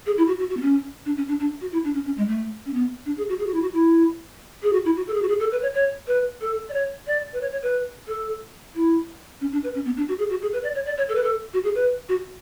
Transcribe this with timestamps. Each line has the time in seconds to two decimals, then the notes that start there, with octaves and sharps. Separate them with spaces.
0.06 G#4
0.17 E4
0.27 F#4
0.39 F#4
0.50 F#4
0.57 B3
0.62 C#4
1.06 D4
1.17 C#4
1.28 D4
1.40 D4
1.61 F#4
1.72 E4
1.84 D4
1.94 C#4
2.05 C#4
2.17 G#3
2.28 A3
2.66 C#4
2.73 B3
3.06 D4
3.17 G#4
3.29 F#4
3.40 G#4
3.47 F#4
3.54 E4
3.62 F#4
3.73 E4
4.63 G#4
4.73 F#4
4.85 E4
4.96 F#4
5.07 A4
5.14 G#4
5.22 F#4
5.29 G#4
5.40 A4
5.52 B4
5.62 C#5
5.74 C#5
6.07 B4
6.41 A4
6.69 D5
6.73 C#5
7.07 D5
7.33 B4
7.41 C#5
7.52 C#5
7.62 B4
8.07 A4
8.75 E4
9.41 C#4
9.52 D4
9.64 B4
9.75 C#4
9.85 B3
9.97 D4
10.08 F#4
10.19 G#4
10.30 F#4
10.42 G#4
10.53 B4
10.63 D5
10.75 C#5
10.86 D5
10.97 C#5
11.09 A4
11.15 B4
11.23 A4
11.54 F#4
11.64 G#4
11.75 B4
12.09 F#4